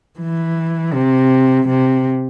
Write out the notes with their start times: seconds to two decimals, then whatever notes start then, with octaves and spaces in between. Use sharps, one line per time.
0.19 E3
0.94 C3
1.68 C3